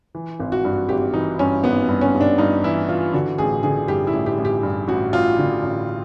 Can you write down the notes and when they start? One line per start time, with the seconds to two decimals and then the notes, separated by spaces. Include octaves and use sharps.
0.15 E3
0.40 G#1
0.52 F#4
0.65 G2
0.89 G#1 G4
1.14 E3 D#4
1.39 G2 C#4
1.64 G#1 B3
1.89 G2
2.01 C#4
2.14 G2
2.21 D4
2.38 G2 D#4
2.64 E3 E4
2.89 E3 F4
3.13 D3 F#4
3.38 A1 G#4
3.63 D3 G#4
3.88 G2 G4
4.07 E4
4.13 A1
4.26 G4
4.38 A1
4.45 G4
4.63 G2
4.88 A1 F#4
5.13 A1 F4
5.39 D3
5.63 A1